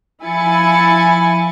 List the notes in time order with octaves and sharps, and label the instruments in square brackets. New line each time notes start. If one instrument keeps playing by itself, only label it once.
[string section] F3 E4 G#5 A6 C#7